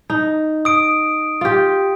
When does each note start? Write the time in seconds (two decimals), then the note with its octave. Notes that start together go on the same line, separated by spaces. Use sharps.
0.10 D#4
0.65 D#6 D7
1.41 F4 G4